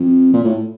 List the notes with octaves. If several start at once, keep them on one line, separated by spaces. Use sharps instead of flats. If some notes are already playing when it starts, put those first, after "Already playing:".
Already playing: F2
A#2
A2